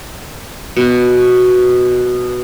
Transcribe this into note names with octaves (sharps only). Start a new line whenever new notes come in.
B2 F#4